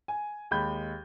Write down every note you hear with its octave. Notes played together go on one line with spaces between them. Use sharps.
G#5
D#2 G#3 B5 G6